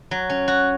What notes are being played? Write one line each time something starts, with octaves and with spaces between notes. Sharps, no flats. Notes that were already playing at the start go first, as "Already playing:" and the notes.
F#3
C#4
F#4